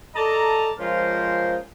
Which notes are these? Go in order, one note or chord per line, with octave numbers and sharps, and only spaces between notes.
A4 D5 D#5 A5 A#5
F3 G#3 C#4 F4 A#4 C5